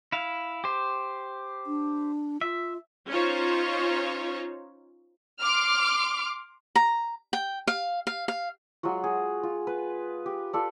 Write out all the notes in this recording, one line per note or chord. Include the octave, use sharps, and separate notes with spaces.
E4 F5
G4 C5
D4
F4 E5
C#4 D#4 F4 C5 C#5
C6 D6 F6
A#5
G5
F5
F5
F5
F#3 G#3 F4 F#4
G#4
F4
B4
G4
F4 A4 D5